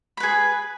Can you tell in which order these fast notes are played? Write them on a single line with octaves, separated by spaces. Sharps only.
B5 B4 G#4